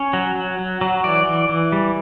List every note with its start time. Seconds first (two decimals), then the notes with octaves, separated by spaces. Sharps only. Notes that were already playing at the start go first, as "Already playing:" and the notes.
Already playing: C#4 C#5
0.13 F#3
0.35 F#3
0.59 F#3
0.81 F#3
1.04 E3 D5
1.26 E3
1.49 E3
1.72 G3